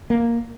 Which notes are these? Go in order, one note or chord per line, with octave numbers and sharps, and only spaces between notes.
A#3